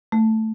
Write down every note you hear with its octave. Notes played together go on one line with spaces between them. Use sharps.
A3